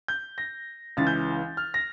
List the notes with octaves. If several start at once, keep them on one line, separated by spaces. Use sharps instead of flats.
G6
A#6
C#2 C#3 E3 A6
G6
F6
A#6